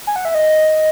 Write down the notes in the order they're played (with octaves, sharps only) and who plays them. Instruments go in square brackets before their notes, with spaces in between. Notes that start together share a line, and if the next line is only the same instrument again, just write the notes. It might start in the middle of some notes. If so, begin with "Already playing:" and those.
[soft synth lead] G#5
F#5
E5
D#5